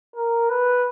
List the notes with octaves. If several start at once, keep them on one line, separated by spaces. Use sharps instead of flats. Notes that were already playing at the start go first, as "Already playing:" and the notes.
A#4
B4